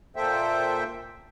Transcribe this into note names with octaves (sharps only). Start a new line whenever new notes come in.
A#2 A#3 A4 C5 E5 G5